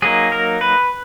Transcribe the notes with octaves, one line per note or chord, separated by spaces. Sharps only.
F#3 A#3 D#4 G#4
A#4
B4